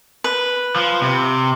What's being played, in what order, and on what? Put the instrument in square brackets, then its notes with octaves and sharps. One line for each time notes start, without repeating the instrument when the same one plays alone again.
[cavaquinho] B4
[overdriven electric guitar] F3
C3